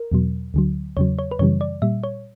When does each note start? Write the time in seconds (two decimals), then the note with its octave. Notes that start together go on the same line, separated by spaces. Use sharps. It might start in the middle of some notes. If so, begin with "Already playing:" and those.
Already playing: A#4
0.12 E2 B2 F#3
0.54 D2 D3 F#3
0.97 E2 C#3 F#3 C#5
1.19 C#5
1.31 B4
1.39 F#2 C#3 E3 G3 C#5
1.61 D5
1.82 A#2 G3 E5
2.03 C#5